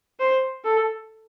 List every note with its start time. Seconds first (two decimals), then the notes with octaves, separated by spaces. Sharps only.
0.19 C5
0.64 A4